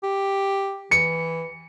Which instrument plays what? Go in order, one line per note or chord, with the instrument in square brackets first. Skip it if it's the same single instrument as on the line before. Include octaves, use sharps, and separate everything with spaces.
[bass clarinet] G4
[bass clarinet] E3 [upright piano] C#7